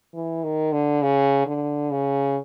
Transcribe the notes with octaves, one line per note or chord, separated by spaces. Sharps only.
E3
D#3
D3
C#3
D3
C#3